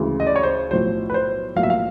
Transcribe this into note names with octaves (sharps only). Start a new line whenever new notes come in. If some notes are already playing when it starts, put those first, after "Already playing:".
Already playing: D2 C#3 E3 G#3
D#5
D5
C#5
C5
B1 A2 F3 C5
B4
C5
B1 A2 F3 A#3 F5
E5
F5